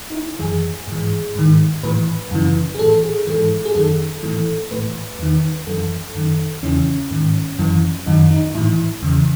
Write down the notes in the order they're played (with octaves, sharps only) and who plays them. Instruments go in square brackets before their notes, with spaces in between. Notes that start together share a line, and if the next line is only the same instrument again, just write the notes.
[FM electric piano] D#4
E4
F#2 E3 G#4
G#2 E3
G#2 D#3
A2 E3 B4
F#2 C#3 E3
G#4
A2 E3 A4
G#4
G#2 E3 A4
G#4
F#2 D#3 A4
A2 E3
A2 E3 B4
E2 D#3
F#2 E3 A4
F#2 D#3
E2 C#3 E3 C#4
G#2 D#3
F#2 E3
F#2 D#3 D#4
D#4
A2 E3 E4
E2 C#3 E3